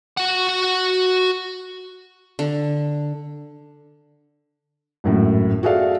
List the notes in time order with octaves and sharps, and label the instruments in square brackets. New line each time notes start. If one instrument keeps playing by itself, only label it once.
[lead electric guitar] F#4 F#5
[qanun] D3
[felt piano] G#1 F#2 A2
F#4 G#4 A4 D5 E5 F5